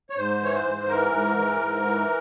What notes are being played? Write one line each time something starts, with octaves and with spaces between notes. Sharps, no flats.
C#5
G#2 C5
E3 C#5
C5
G#2
E3 A#4
G#2
E3
G#2
E3